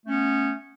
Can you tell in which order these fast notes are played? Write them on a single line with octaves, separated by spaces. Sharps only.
A3 C#4 B3